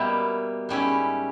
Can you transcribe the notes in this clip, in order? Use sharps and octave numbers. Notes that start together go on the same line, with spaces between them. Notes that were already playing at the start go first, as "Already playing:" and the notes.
Already playing: B2 G3 A#3 E4 E5
G#2 G3 C#4 E4